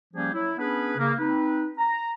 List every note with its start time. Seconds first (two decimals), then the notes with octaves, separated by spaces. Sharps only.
0.14 F3 G3 A#3 C#4 G4 G#4
0.33 F#3 E4
0.58 B3 C#4 D4 G#4 B4
0.97 C#3 A#3
1.18 C4 D#4 B4
1.78 A#5